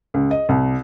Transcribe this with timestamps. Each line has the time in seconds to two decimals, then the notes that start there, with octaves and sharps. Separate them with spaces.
0.14 C#2
0.31 D#5
0.49 C2